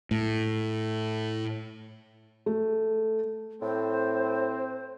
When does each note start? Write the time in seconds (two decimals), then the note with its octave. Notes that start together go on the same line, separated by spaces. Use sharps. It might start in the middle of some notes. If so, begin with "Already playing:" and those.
0.11 A2
2.46 A3
3.62 A2 C4 C5